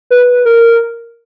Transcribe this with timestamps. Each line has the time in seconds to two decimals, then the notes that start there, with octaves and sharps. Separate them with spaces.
0.10 B4
0.45 A#4